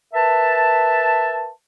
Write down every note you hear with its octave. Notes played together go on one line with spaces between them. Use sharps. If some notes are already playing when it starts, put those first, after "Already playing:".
A#4 B4 E5 A5